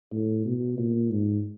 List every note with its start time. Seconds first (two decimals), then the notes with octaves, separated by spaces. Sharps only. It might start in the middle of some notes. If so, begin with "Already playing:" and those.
0.12 A2
0.45 B2
0.78 A#2
1.11 G#2